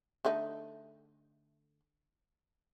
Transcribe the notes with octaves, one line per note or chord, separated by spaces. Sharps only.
D3 A3 D#4